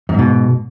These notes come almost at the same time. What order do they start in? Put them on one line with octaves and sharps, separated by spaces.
F2 G#2 B2